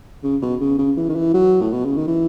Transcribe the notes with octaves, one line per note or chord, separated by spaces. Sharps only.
C#3
B2
C#3
C#3
E3
D#3
E3
F#3
A2
B2
C#3
D#3
E3